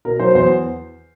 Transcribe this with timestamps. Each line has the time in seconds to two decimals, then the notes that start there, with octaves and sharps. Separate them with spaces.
0.05 B2 A#4
0.20 F#3 C5
0.35 E2 C5